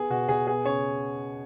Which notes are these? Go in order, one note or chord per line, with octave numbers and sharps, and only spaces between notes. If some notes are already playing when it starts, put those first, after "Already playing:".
Already playing: B3 G#4
B2 F#4
B2 G#4
B3 G#4
C#3 C#5